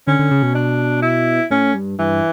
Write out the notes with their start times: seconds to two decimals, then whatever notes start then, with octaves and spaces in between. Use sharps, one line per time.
0.07 D3 C#4
0.19 D3
0.31 C#3
0.43 B2
0.55 D4
1.02 E4
1.50 A2 C#4
1.74 G2
1.99 G2 E3